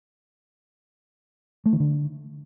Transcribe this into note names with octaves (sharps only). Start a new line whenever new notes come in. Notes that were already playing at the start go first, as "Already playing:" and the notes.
A3
D#3
D3